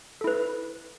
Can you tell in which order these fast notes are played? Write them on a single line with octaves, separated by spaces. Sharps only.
A4 E4 B4